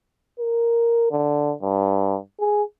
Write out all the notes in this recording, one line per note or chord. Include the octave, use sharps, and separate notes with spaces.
A#4
D3
G2
G#4